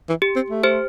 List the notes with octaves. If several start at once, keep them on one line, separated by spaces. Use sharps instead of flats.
E3
G4
C4
A3
G4 C5